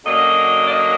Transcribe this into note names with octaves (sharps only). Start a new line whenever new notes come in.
F#2 D3 F#3 A#3 D#5
D5
D#5